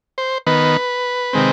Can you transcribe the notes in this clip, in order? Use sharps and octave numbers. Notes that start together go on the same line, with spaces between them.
C5
D#3 B3 B4
C3 D#3 G#3 C4